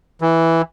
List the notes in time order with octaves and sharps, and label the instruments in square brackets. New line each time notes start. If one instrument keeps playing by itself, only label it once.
[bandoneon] E3